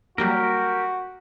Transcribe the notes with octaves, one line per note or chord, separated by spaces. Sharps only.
F#3 G3 A#3 F#4 G4 A#4